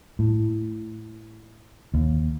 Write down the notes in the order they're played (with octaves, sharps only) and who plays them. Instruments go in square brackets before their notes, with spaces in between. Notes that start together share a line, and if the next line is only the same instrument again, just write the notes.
[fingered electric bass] A2
D#2